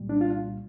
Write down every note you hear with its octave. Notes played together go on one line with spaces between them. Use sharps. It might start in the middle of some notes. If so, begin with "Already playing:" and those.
Already playing: C2 A#2 G3
D4
F4